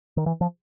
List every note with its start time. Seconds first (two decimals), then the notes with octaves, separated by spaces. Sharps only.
0.17 D#3
0.26 E3
0.41 F3